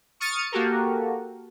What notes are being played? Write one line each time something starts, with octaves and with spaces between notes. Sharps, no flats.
C#6 D#6 F6 A6 C#7 D#7
A#3 F#4 G4 A4 A#4